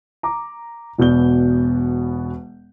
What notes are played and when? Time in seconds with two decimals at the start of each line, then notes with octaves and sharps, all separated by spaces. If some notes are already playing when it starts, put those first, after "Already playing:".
0.23 A#5 D6
0.98 E1 B2 B3 D5 G6 G7